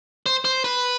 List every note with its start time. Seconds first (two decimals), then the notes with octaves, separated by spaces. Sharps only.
0.26 C5
0.45 C5
0.64 B4